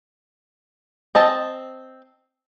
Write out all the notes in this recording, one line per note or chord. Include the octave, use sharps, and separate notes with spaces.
C4 D#5 A5